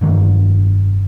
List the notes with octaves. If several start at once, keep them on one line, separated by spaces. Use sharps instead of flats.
F1 G2 D#3